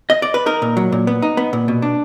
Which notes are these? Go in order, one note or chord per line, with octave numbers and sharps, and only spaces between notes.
D#5
D5
B4
D#4 A#4
A#2
F#3
A#2
B3
D#4
B3
A#2
B2
D4